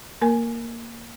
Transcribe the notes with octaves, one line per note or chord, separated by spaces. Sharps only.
A#3 A#4 G#5